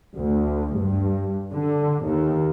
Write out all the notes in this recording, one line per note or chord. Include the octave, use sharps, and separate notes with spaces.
D2
G2
D3
D#2